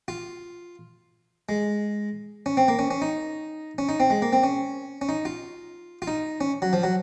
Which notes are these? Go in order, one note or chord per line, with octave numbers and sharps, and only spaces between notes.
F4
G#3
C#4
C4
A#3
C#4
C#4
D#4
C#4
D#4
C4
G#3
A#3
C4
C#4
C#4
D#4
F4
F4
D#4
C#4
F#3
F3
F#3